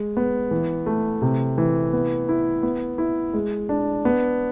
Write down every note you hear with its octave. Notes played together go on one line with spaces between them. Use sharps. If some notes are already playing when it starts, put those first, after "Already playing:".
Already playing: G#3
B3
E3
A3
C3
E3
B3
E4
B3
E4
G#3
D4
B3